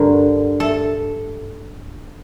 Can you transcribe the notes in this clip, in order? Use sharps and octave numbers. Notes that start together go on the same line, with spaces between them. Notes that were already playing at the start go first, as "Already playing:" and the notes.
Already playing: G2 D3 A#4
A4